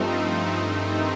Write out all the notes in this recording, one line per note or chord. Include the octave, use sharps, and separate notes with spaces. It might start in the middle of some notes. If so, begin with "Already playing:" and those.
Already playing: G2 F3 A3 C4 D#4
G2 D#3 A3 C4 D#4